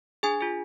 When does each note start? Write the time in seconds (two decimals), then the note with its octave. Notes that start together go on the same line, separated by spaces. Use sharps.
0.23 D4 G#4 G#5
0.40 F4 G#4